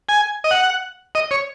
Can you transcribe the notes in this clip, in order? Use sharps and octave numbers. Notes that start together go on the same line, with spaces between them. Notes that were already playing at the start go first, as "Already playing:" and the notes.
G#5
D#5
F#5
D#5
C#5